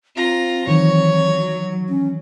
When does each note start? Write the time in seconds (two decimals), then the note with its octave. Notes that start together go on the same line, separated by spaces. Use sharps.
0.16 C4 F4 A#5
0.67 D#3 E3 F#3 C#5
1.89 C#4